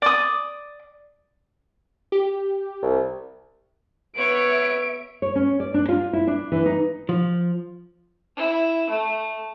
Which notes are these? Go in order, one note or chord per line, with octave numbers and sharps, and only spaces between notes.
D5 D#6
G4
C2
B3 C#5 E5 D7
C#5
C#4
D5
D4
F4
E4
D4
E3
D#4
F3
E4
A3